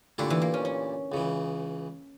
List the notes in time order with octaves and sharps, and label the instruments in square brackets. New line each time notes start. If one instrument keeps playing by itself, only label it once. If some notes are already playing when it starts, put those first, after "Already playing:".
[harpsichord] A#2 A3 E4 G4 [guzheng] D3
[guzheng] E3
A#3
C#4
C#4
[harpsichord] C#2 C#3 E3